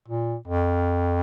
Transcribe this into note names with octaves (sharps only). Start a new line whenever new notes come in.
A#2
F2